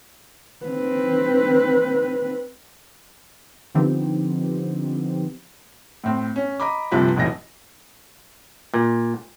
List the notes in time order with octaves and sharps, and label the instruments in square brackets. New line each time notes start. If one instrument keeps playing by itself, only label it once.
[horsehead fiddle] C4 B4
[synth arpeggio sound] D3 F3 B3 C4 D#4 G4
[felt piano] A2 C4
C#4
D#5 A#5 B5 D6
G1 C2 C3 F3 B3 B4
F1 B1 E3 D#5 A#6
[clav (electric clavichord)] A#2